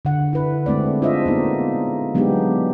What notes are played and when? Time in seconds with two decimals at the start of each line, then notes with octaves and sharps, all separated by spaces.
0.05 D3 F#5
0.33 E4 B4
0.66 G#3 A3 C4 D5
1.02 D4 F4 G#4 C5 D#5 E5
1.26 A#3 B3 D#4
2.15 F#3 G#3 B3 D4 D#4 G4